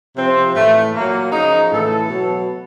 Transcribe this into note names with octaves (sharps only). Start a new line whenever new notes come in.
C3 F3 C4
A2 E3 A3
A#2 F#3 A#3
C#3 F3 D#4
A2 E3 A4
B2 F#3